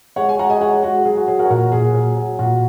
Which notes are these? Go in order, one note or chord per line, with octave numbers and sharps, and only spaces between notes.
G#3 C#5 F#5
G#5
G#3 F#5 A#5
D#5 G#5
G#3 C#5 F#5
G#3 F#4
F#3 G#4
F#4
F#3 G#4
F#4 A#4
C#5
A#2 F#4 A#4
A#2 G#4
F#3
F#3
A#2 F#4